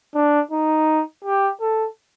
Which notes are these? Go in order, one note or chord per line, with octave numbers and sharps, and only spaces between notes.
D4
D#4
G4
A4